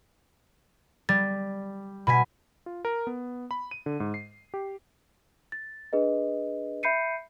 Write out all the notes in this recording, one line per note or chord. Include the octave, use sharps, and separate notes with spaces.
G3 A6
B2 G#5 B5 B6
F4
A#4
B3
B5
D#7
D3
G#2
C7
G4
A6
D4 G#4 B4 D#5
E5 B5 G6 C7 C#7 D#7